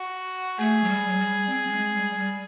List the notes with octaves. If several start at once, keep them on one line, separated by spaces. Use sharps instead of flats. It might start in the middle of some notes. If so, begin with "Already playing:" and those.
Already playing: F#4
A3 G#4
F#3
G3
F#3
G3
C4
G3
G#3
G3
G#3
G3